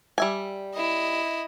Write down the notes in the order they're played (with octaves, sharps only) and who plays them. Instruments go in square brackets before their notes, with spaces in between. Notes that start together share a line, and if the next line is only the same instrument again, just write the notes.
[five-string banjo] G3 E5 G#5
[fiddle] E4 D#5